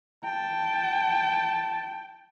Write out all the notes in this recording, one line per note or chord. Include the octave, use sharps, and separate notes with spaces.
G5 A5